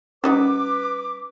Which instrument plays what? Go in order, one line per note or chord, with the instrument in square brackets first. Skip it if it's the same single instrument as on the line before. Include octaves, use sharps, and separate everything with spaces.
[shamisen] G3 D#4 F#4 [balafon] C#4 [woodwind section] B4 D6